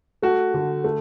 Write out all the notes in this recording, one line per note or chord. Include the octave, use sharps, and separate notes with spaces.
A3 F#4
D3
A3